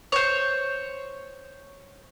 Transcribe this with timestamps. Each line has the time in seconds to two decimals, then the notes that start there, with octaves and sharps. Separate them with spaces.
0.12 C5 C#5